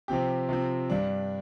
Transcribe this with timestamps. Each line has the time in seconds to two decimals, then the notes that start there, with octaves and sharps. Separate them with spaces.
0.08 C3 F3 C4 G4
0.49 C3 F3 C4
0.90 G2 G3 D4